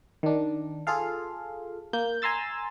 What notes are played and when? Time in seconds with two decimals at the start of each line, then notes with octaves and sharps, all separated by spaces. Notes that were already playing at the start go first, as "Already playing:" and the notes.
0.23 D#3 D4
0.87 F4 G#4 A4 F5
1.93 A#3 G6
2.22 G#5 A#5 C6 E6 A6